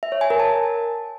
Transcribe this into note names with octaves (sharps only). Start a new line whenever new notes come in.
E5
C#5
G#5
A#4
A5